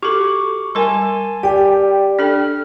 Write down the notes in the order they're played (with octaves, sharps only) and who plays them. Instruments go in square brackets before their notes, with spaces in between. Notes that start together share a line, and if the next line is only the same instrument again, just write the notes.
[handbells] F#4 C#6 D6 [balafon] G4 A4
[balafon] G3 A#4 [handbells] G#5 A5 C6
[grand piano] G4 [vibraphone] D5 G5
[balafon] D4 A4 [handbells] F6